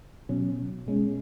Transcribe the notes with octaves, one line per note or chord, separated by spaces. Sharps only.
B2 F#3 C#4
B2 G#3 C#4